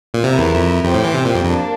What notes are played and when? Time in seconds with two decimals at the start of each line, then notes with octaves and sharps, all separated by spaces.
0.14 A#2
0.23 C3 E4 A#4 E5
0.38 E2
0.54 F2
0.84 F2 G4 C5 G5
0.94 A2
1.04 E3
1.14 C3
1.25 A#2
1.35 F2
1.45 F2 A#3 D4